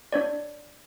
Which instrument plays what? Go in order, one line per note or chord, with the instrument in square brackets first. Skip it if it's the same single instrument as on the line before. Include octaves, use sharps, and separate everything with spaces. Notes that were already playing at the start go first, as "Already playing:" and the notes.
[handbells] D4 C#5 D5